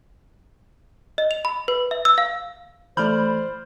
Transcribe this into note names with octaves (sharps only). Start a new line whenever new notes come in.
D#5
F7
B5
B4
E5
E6
F5
E3 A3 C5 D5 B5 F6 G6